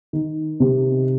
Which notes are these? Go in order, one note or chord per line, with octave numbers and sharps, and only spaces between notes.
D#3
C3